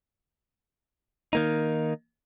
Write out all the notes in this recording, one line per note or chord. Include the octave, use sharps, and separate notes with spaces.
D#3 A#3 D#4